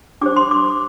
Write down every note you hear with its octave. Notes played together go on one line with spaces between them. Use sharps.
D4 G4 C5 D6
C6
D6